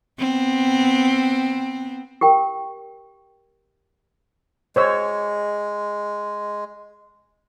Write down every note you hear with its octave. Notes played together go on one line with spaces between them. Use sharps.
B3 C4
G4 A#4 G5
G#3 C5 C#5 E6